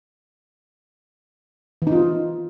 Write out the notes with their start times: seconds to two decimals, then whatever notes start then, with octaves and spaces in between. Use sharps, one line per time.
1.82 E3
1.87 D#4
1.92 F4